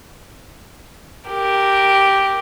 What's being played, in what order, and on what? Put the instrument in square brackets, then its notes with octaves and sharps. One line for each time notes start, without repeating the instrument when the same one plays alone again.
[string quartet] G4 A#4